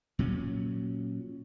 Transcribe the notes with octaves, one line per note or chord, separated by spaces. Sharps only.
A#2 F#3 C#4